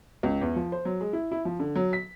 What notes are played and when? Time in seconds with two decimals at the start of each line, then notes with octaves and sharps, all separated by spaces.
0.23 C#2
0.41 E2
0.56 F3
0.72 C5
0.85 F#3
1.01 G#3
1.13 E4
1.32 E4
1.45 F3
1.60 D3
1.75 F#3
1.93 B6